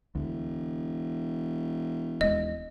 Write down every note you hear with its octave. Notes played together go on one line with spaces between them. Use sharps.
E1 D2
D#1 G#3 D#5